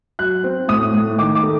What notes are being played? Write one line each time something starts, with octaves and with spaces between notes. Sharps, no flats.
F#3 F#6
C4
A2 D#6
A2
D#3 D6
D6
A3